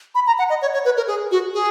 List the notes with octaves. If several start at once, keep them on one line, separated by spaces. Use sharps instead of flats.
B5
A#5
F#5
D#5
C#5
C#5
B4
A#4
G#4
F#4
G#4